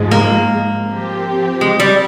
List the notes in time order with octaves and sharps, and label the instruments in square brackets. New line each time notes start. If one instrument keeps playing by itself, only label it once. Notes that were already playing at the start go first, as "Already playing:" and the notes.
Already playing: [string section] G#2 F3 G#3
[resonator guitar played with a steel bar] A#3
[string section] F3 C4 G4
[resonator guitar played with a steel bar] G#3
G3